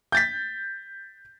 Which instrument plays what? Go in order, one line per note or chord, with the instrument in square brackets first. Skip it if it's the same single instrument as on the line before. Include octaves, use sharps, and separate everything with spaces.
[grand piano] G6 A6 B6